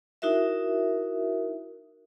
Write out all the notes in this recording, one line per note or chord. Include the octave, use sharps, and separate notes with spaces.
D#4 E4 F#4 A#4 E5